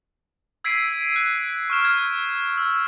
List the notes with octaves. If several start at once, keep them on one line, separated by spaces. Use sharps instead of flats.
E6 G#6 B6 C7 D7 D#7
D#7
F#6
C#6 F6 E7
G#6
E6